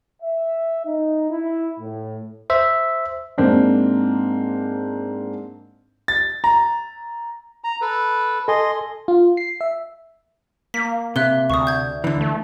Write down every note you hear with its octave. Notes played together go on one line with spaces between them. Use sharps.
E5
D#4
E4
A2
C5 E5
G#2 A#3 C4 D4
A6
A#5
A#5
A4 B4
A4 D#5 G#5 C6
F4
C7
E5
A#3 B6
C3 E5 F#6 G7
D2 C#6 D#6
G6 G#6
D3 E3
A3